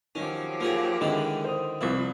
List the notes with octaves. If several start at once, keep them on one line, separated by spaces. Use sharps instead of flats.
D#3 F3 F#3 C#4 G4
A#3 F4 G#4
D3 D#3 G#3 D4 E4
C5 D#6
C2 F3 E4